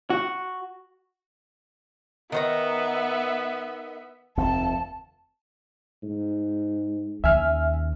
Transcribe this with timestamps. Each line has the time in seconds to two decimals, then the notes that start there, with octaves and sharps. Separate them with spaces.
0.10 F#4
2.32 D#3 B3 C5 E5 A#5
4.37 F1 D#2 C4 A5
6.03 G#2
7.24 D#2 C#4 E5 G#5 F6